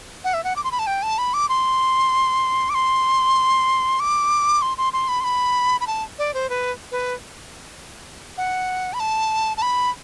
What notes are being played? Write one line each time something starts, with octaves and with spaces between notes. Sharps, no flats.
F#5
E5
F#5
D6
C6
B5
A5
G5
A5
B5
D6
C6
D6
C6
D6
C6
C6
C6
B5
C6
B5
B5
A5
D5
C5
B4
B4
F#5
B5
A5
A5
B5